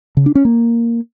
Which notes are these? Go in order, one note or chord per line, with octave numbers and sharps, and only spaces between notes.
C#3
D4
C#4
A#3